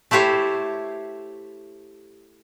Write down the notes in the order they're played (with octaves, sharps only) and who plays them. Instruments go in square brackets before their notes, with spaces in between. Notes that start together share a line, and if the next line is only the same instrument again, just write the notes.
[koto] A3 E4 G4 C5 C#5